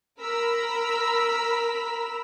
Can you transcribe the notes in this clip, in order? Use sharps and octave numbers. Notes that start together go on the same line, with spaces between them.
A#4 A#5 B5 E6 B6